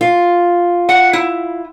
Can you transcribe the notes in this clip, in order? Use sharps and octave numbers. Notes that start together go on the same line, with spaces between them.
F4
F#5
E4